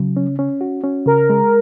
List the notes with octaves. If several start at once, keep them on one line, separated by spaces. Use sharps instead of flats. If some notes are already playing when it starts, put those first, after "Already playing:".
Already playing: C#3 F#3
C#4
C#4
F#4
C#4
C#3 A#4
G#3